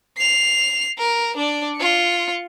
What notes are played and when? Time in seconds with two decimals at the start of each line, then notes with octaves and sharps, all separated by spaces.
0.17 C7 F7
0.98 A#4
1.36 D4 D5
1.77 F4 C#7